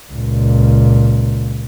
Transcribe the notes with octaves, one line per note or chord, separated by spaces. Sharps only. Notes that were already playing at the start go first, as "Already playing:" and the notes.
C#2 A#2